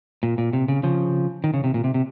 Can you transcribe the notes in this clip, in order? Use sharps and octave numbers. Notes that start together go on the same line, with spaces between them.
A#2
A#2
C3
C#3
C#3 F3
D#3
C#3
C3
A#2
C3
C3